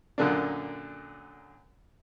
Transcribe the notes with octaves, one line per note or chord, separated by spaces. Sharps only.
F#2 A#2 D3 A#3 D4